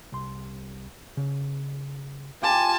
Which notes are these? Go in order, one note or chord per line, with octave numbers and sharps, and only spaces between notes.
C2 C6
C#3
F4 G4 F5 G#5 A5